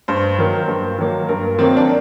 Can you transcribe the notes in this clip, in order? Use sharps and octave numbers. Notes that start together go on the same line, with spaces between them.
G2 C5
D#3 F#3 A#3
G2
D#3 F#3 A#3
G2 A#4
D#3 F#3 A#3 C4
D4